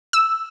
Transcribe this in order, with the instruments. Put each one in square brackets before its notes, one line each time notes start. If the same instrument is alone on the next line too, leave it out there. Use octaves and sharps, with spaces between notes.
[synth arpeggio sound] E6